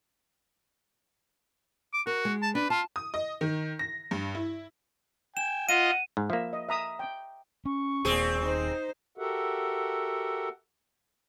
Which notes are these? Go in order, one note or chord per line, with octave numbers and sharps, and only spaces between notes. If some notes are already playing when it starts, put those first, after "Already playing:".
D6
F#4 A#4
G#3
A5
D4 B4
F4 A5
D#6
D#5
D#3
A#6
G2
E4
G5 G#5 E7
F4 D#5 F#5 D#7
G#2
F3 A#3 E5
D#5
E5 A#5 D#6
G5
C#4 C#6
D#1 A#2 C4 G#4
D#4 C5
F#4 G4 A4 A#4 E5 F#5